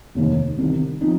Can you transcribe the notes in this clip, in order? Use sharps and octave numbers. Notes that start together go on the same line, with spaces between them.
F1 D#2 D#3
C2 C3 D#3
F3 C4 D#4